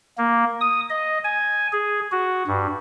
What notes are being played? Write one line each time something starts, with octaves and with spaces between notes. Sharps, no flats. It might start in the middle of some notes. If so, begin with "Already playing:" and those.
A#3
D#6
D#5
G#5
G#4
F#4
G2